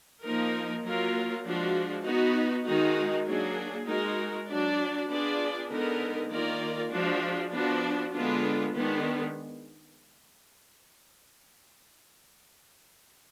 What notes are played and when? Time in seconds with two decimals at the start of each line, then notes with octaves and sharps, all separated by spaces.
0.22 F3 A#3 D#4 A#4
0.83 F#3 A#3 F4 A#4
1.44 F3 G#3 D4 F#4
2.04 B3 D#4 F#4
2.65 D#3 G#3 D#4 F#4
3.26 F#3 A#3 D4 G#4
3.87 G#3 D#4 F#4 A#4
4.48 F#3 D4 F#4 D5
5.08 B3 D4 F4 G#4 D5
5.69 D3 G#3 B3 D#4 A#4
6.30 D#3 A#3 F4 A#4 D5
6.91 F3 G#3 D4 F#4
7.51 F3 B3 D4 F#4
8.12 D3 G#3 B3 D4 F4
8.73 D#3 G#3 B3 D4